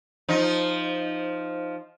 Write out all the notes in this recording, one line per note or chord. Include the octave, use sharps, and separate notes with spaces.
F3 D#4